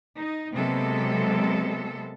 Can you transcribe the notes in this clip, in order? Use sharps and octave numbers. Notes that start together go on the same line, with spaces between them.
D#4
C3 F#3 G#3 A#3 B3 A4